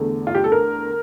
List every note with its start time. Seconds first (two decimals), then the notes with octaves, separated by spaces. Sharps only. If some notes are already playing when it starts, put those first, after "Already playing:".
Already playing: E2 D3 A3
0.27 F4
0.35 G4
0.44 A4
0.52 A#4